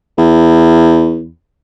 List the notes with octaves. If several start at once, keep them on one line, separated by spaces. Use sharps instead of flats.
E2